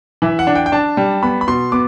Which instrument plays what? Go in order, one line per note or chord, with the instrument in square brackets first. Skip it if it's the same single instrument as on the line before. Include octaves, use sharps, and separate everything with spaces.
[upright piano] E3 [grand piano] E5
[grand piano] F#5
[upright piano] D4
[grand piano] G5
G5
[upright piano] D4 [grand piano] A5
[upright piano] G3
[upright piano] B3 [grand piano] B5
[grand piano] B5
[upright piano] B2 [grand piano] C6
[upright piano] B3 [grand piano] D6